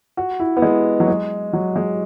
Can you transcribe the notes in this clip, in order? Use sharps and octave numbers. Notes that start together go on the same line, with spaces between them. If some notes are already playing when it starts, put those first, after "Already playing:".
F#4
E4
B3
G#3
F#3
G#3
F#3
G#3